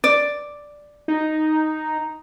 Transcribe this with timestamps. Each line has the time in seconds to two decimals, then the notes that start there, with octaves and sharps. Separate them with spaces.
0.04 D5
1.08 D#4